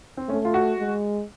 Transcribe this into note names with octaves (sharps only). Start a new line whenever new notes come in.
C4
A3 C#4
F4
F#4
G#3